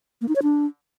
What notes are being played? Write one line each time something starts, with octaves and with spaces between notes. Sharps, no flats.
A#3
D#4
C#5
D4